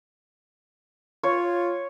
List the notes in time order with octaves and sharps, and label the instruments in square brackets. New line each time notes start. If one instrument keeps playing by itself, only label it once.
[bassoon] F4 [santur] C#5